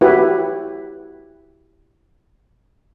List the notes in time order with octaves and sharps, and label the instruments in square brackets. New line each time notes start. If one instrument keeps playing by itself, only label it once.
[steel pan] E4 F#4 G4 B4